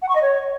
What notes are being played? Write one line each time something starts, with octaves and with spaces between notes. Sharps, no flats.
F#5
C#6
D#5
C#5